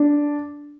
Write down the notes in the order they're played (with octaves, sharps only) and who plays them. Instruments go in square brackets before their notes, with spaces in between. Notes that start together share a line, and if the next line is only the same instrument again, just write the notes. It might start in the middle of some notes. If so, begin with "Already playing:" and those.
Already playing: [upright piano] D4